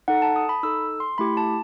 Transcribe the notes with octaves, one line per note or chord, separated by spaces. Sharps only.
D#4 A4 F#5
A5
D#6
B5
D#4 A4 E6
C6
A3 E4 G4 B5
A5